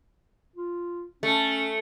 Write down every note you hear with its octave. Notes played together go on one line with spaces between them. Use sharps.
F4
A3 C#4